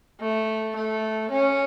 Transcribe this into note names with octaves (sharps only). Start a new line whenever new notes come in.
A3
A3
C#4